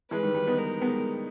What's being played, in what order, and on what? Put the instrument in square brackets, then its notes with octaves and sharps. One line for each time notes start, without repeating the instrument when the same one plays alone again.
[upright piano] E3 G#3 [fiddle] B4
[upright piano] D#3 G3
D#3 G3
B3 D#4
[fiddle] A#4
[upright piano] G#3 B3